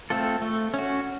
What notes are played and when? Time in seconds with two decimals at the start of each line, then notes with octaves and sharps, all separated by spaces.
0.10 A3 C4 F4 A4
0.42 A3
0.74 C#4 F#4